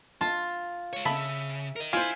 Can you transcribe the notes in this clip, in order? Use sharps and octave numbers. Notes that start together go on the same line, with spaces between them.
F4 A5
G#3 C#5
C#3 E5 A5 B5
A#4 D#5
E4 F4 C5 G#5